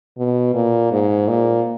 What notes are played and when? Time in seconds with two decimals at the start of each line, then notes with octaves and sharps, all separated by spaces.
0.18 B2
0.54 A#2
0.92 G#2
1.28 A#2